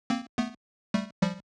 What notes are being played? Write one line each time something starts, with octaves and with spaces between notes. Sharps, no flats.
A#3 C4
A3 B3
G3 A3
F3 G3